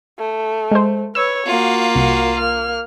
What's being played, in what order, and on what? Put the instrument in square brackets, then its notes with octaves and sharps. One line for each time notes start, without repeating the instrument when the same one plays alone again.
[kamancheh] A3
[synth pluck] G#3 C5
[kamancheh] B4 C#5 [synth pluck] E6
[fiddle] A#3 F4 [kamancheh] F#4
[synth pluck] C2 [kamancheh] F#4 A#4
[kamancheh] A#3 F6